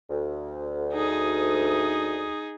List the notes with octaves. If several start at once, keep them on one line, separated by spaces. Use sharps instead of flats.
D2
D#4 G#4